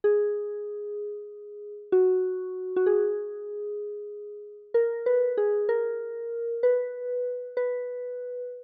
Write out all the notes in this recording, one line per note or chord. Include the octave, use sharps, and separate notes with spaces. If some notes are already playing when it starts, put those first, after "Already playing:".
G#4
F#4
F#4
G#4
A#4
B4
G#4
A#4
B4
B4